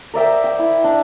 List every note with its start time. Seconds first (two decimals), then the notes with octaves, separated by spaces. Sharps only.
0.14 A#4 D5 E5 G5
0.44 G5
0.59 E4
0.84 D4